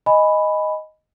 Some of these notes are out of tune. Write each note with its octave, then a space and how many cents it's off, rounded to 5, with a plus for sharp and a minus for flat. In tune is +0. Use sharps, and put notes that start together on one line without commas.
D#5 +0 G#5 +0 B5 +5